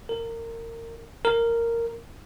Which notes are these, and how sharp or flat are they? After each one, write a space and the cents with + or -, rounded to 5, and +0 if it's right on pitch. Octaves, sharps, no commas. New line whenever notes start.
A#4 -25
A#4 -10